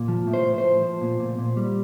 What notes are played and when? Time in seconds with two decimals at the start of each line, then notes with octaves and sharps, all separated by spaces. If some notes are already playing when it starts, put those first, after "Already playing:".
Already playing: A#2
0.08 F3
0.27 A2
0.34 C5
0.46 A2
0.58 C5
0.65 F3
0.83 F3
1.01 A#2
1.20 A#2
1.38 A#2
1.57 G3